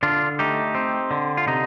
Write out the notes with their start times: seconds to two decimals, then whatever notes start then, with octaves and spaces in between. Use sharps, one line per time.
0.03 D3 D4 F4
0.39 A3 D#4 G4
0.75 C4
1.11 D3
1.37 F4
1.47 C3 D#4